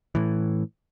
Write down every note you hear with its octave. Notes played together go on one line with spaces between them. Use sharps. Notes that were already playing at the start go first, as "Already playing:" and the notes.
A2 E3